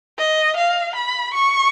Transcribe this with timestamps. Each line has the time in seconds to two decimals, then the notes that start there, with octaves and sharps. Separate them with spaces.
0.18 D#5
0.56 F5
0.96 B5
1.34 C#6